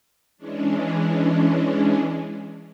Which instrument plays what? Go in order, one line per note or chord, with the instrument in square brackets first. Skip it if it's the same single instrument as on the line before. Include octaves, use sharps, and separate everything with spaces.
[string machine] E3 G#3 C#4 D4